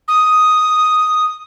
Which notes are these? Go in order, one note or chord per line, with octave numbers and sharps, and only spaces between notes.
D#6